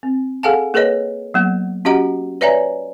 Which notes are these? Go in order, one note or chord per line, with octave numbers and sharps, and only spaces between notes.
C4
G#4 A4 F5 F#5 G#5 A5
A#3 G#4 A#4 B4 C#5 D#5
F#3 A#3 B3
C#4 F#4 G4 D#5 F#5 A#5
B4 C#5 D5 E5 G#5 A#5